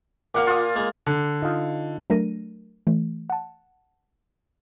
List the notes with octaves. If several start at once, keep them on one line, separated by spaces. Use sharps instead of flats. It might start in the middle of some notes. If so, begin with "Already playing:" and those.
A#2 A#3 F5 F#5 D6
F4 D#6
G#3 A#3
D3
D#4 F4
F#3 A3 D4 A#4 A#6 D#7
E3 A3
F#5 A5